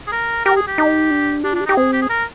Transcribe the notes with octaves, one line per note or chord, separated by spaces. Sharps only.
G#4
A#4
G4 A#4
G#4
G4
D#4
D4
D4 G4
F4
D4 G4
D#4 G4
C4 G#4
G4
G#4
A#4